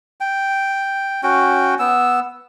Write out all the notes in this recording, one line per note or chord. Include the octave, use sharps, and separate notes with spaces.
G5
C#4 F#4 G5
B3 E6